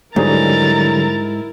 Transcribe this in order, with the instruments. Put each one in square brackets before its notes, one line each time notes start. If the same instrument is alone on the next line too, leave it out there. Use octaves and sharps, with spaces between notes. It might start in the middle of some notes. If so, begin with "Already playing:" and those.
[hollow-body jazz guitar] G#2 [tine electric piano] D3 F#3 G3 [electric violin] E4 A#4 [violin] A#5 A6